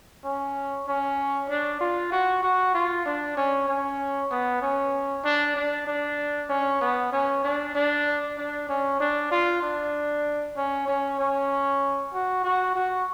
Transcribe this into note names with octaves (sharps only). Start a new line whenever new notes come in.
C#4
C#4
D4
F4
F#4
F#4
F4
D4
C#4
C#4
B3
C#4
D4
D4
D4
C#4
B3
C#4
D4
D4
D4
C#4
D4
F4
D4
C#4
C#4
C#4
F#4
F#4
F#4